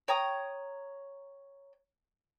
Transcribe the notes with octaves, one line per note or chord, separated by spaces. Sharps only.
C#5 G5 A#5 D#6